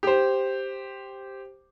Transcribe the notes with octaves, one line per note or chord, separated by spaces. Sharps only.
G4 C5